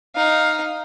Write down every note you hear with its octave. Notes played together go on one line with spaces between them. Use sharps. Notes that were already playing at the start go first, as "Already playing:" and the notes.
D#4 F5